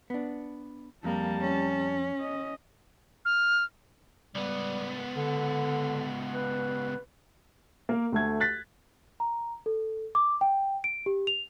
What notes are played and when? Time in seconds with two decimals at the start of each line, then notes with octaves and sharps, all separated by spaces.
0.10 B3 D4
1.04 F2 G3 A#3 A5
1.41 C#4
2.21 D#5
3.25 F6
4.35 C#2 G3 B3
5.15 D3
6.34 B4
7.89 A#3 A#4
8.12 D2 A3 G#6
8.40 F#6 A6 B6
9.20 A#5
9.66 A4
10.15 D6
10.41 G5
10.84 D7
11.06 G4
11.27 F7